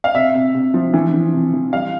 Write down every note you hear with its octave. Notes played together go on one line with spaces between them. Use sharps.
F5
C3 E5
C3
C3
F3
E3
E3
C3
E3
G3 F5